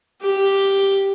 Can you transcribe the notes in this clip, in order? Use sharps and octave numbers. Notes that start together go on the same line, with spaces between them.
G4